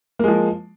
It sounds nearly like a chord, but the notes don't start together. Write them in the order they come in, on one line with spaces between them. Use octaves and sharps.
A#3 G#3 F3